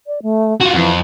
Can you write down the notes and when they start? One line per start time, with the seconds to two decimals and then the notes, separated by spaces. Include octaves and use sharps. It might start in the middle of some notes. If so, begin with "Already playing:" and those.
0.07 D5
0.23 A3
0.61 F4 F#4
0.74 F2 E3